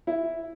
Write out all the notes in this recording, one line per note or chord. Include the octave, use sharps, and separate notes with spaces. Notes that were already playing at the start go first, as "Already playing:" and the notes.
E4